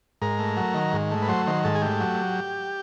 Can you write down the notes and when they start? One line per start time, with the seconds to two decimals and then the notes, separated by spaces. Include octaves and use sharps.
0.22 G#2 A#4
0.39 A3
0.57 F#3
0.74 D#3
0.93 G#2
1.11 A3
1.22 B4
1.28 F#3 C5
1.47 D#3 C5
1.64 G#2 A4
1.75 G#4
1.82 A3 G4
2.00 F#3